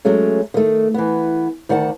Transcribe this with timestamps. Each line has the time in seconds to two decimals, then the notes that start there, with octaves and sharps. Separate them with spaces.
0.05 F#3 G#3 A3 C#4
0.54 D#3 A3
0.94 E3 B3
1.69 D2 D#3 D5 F#5 A5